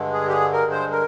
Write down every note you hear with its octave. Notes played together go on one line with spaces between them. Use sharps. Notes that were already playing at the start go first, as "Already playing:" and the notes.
Already playing: G2 D3 G#3
G#4
G4
G#4
A#4
C5
A#4